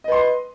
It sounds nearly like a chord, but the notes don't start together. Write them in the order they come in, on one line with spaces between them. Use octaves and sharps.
D#5 B4 C6